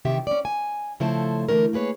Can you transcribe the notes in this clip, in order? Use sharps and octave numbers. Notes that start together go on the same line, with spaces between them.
C3 D#3 E3 G4 E5
C#4 D5
G#5
C#3 F3 A3 E4 A4 C5
D3 E3 A3 C#4 A#4
A#3 G#4 B4 C#5